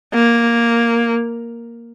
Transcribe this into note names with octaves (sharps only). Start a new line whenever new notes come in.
A#3